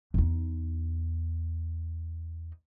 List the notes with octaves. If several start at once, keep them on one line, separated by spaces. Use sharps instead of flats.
E2 D#4